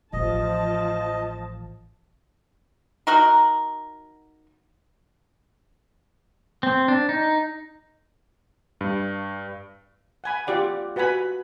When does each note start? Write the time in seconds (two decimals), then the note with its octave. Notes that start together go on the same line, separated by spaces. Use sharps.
0.13 A1 F3 D#5 A5
3.07 D#4 F#4 A#4
6.63 C4
6.88 D4
7.09 D#4
8.81 G2
10.24 F#5 G#5 B5
10.47 F4 G4 D5 F#5
10.96 F#4 B4 F#5 G#5 B5